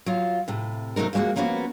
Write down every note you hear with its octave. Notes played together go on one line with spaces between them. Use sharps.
F#3 F4
A2 C3
C3 F#3 A3 D#4 A#4
F3 G3 G#3 A#3 F#4
F3 A#3 B3 C#4 D#4 F#4